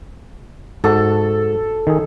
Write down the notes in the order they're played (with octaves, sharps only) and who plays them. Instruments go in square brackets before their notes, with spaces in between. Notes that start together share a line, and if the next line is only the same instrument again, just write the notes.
[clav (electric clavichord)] G#2 F#4 A5 [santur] A4
[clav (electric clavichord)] D#3 G#4